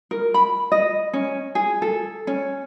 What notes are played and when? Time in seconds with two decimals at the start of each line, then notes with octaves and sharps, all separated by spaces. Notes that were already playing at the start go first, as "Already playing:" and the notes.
0.11 A#4
0.34 B5
0.72 D#5
1.13 C#4
1.55 G#4
1.82 A4
2.27 C#4